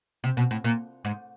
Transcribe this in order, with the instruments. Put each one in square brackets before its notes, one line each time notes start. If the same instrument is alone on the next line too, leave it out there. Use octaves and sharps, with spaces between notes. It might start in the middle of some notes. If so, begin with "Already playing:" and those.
[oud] C3
B2
A2
A#2
G#2